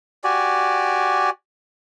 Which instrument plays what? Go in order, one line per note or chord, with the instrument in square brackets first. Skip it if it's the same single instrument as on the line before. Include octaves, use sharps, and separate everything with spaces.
[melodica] F#4 G4 D5 G#5